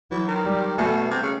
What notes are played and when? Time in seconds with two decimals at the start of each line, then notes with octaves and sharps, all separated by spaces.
0.11 E3 F#3
0.28 D#3
0.45 G3
0.77 B2 A3
1.11 C3
1.22 C#3